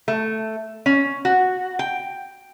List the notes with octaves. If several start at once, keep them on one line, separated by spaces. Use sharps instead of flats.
A3
C#4
F#4
G5